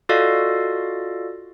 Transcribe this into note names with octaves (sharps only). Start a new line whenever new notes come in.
F4 F#4 A4 D5 D#5 F5